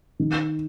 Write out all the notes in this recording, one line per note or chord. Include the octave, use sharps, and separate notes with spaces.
D#3